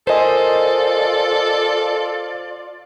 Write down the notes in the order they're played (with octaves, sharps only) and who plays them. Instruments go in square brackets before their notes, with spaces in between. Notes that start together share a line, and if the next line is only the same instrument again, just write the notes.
[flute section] F4 D5 [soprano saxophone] A4 [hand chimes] A#4 G#5 C6 [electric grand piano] C5 D#5